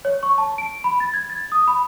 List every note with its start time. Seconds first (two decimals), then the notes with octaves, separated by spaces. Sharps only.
0.05 C#5
0.23 C#6
0.38 A5
0.58 D7
0.84 B5
1.00 A6
1.14 G#6
1.30 A6
1.52 D#6
1.68 B5